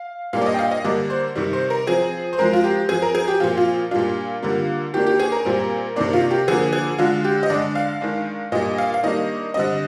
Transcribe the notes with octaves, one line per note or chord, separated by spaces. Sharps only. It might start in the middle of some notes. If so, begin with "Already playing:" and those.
Already playing: F5
A#2 G3 A#3 D4 F5
D5
D#5
G5
F5
D#5
D3 G3 A#3 D4 D5
C5
C3 D#3 G3
C5
A#4
F3 C4 G#4
C5
F3 G#3 C4 A#4
F4
G4
F3 C4 G#4
A#4
G#4
G4
A#2 F3 C4 F4
F4
A#2 G3 D4 F4
D3 G3 A#3
D#3 A#3 D4 G4
G4
G#4
A#4
A#2 G3 C4
C3 D#3 A#3 D4 D5
F4
G4
D3 F3 A#3 G#4
G#4
D3 G#3 D4 F4
G4
D#5
D3 G#3 D4 D5
F5
D#3 G#3 D4
A#2 G3 D4 D#5
F5
F5
D#3 G3 A#3 D4 D#5
D3 G3 C4 D#5